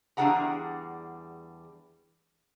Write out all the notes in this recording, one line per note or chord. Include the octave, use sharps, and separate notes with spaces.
E2 G3 D4 G#4 F#5 A#5